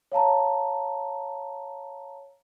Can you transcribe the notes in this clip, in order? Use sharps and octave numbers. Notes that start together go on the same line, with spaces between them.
C#5 F5 A5 A#5